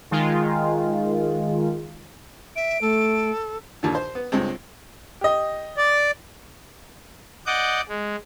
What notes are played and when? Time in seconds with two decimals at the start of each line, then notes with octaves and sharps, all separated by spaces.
0.11 D#3 G#3 F4
2.56 E5 D7
2.81 A3 A4
3.83 D#2 A#2 D3
3.95 C5
4.15 B3
4.32 C#2 G2 G#3 C4
5.21 G4 D#5
5.77 D5
7.47 D5 D#5 F#5 D6 G6
7.89 G#3